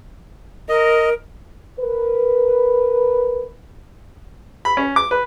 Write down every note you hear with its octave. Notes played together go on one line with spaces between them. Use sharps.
A#4 D#5
A#4 B4
B5
C#4
D6
B4